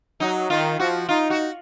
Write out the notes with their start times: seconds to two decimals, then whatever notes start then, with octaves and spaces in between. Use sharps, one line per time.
0.20 F#3 D#4
0.50 D#3 F4
0.79 F3 F#4
1.09 D#4 F4
1.30 F#4